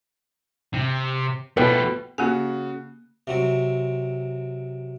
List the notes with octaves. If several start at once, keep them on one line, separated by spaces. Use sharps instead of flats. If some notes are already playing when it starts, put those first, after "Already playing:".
C3
B2 F3 A3 B4 G5
C#3 A#3 F#4 G4 G#5
C3 F#3 C4